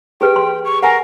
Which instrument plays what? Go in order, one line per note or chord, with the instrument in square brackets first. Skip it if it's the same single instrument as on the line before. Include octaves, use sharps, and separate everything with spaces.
[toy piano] G4 G#4 B4 [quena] G5
[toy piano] C6
[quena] C#6
[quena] A#4 [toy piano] F#5 G#5